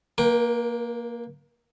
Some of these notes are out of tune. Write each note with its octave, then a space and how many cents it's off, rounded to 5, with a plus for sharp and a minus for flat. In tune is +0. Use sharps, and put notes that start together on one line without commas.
A#3 +0 A#4 +45 G5 -5